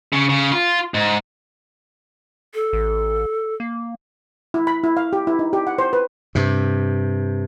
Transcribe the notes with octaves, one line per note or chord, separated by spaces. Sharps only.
C#3
C#3
F4
G#2
A4
A1
A#3
E4
B5
E4
F5
G4
E4
D#4
G4
F#5
C5
B4
G2 C3